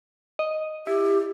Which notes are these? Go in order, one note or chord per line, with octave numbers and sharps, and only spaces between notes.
D#5
E4 G4